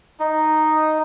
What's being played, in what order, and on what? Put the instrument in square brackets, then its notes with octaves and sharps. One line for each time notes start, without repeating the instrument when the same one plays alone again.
[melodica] D#4